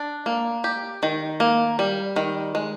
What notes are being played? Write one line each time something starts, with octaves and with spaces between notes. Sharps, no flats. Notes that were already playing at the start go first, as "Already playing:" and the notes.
Already playing: D4
A#3
G4
D#3
A#3
G3
D#3
G#3